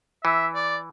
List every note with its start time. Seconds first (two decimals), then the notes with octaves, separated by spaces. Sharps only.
0.24 E3 E5
0.55 D5